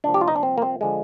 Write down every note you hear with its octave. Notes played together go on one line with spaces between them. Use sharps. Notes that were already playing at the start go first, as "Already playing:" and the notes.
C2 A#2 F3 D4
G4
F4
D#4
D4
C4
A#3
C4
D3 F3 G#3